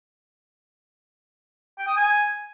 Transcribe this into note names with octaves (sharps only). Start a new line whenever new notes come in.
G5
D#6
G#5